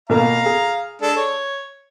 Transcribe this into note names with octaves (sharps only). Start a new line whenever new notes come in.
B2 A#3 F5 A#5
G#4
G#3 D4 A4
C#5